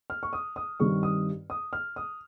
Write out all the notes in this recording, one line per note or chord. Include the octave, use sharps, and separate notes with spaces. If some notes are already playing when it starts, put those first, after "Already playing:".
F6
C#6
D#6
D#6
G2 D#3 G3 C4 C#6
D#6
D#6
F6
D#6